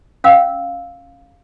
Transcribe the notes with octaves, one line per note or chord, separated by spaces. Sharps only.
C#4 F5 E6